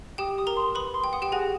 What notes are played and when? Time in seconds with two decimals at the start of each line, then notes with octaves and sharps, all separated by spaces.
0.18 G4 G5 D#6
0.38 D#6
0.47 A#4 A#5
0.56 C6
0.75 B4 B5 D#6
0.94 C6
1.04 G5
1.13 F#5 D#6
1.22 G4 G5
1.32 F#4 G#4 G#5